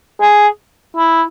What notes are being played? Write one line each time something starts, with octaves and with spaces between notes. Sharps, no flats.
G#4
E4